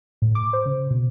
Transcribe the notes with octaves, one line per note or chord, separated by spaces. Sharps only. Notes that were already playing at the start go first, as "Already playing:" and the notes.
A2
D6
C5
C#3
B2